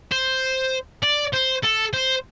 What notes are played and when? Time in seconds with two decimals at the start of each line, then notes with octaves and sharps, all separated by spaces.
0.12 C5
1.02 D5
1.33 C5
1.63 A4
1.93 C5